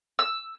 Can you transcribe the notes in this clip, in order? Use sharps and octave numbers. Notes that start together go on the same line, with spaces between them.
E6